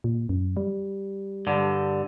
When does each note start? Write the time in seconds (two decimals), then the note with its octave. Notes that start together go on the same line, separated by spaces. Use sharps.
0.04 A#2
0.29 F#2
0.57 G3
1.47 G2 D3